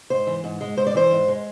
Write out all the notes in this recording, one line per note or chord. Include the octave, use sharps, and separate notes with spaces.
G#2 C5
E3
G#2
G#3
G#2 C5
D5
E3 C5
G#2
G#3